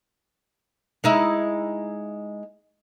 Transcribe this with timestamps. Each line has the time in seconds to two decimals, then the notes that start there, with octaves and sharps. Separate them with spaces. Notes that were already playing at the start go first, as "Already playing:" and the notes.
1.04 G#3 D#4 E4